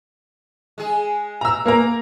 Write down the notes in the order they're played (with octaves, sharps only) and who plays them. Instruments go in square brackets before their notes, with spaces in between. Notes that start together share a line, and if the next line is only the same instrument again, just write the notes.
[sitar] G#3 G#4
[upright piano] A#5 E6
A#3 A#4 A#5